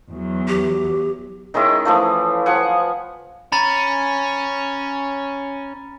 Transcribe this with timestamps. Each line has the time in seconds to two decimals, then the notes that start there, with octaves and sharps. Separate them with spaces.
0.10 E2 F#3
0.48 G4
1.54 D#3 G#3 C#4 E4
1.85 E3 F3 A3
2.46 F3 B4 F#5 G#5
3.52 C#4 A#5 B5 A6